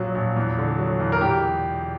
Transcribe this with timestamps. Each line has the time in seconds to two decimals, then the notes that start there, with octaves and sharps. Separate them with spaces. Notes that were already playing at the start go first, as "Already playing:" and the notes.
Already playing: A#1 A#2 F#3
0.15 A#1
0.37 E2
0.58 D3
0.79 F#3
1.00 E2
1.12 A#4
1.21 E1 G4